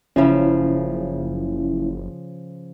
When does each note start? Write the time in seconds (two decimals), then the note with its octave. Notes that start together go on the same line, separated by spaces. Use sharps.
0.16 F#1 C#3 F3 C#4 E4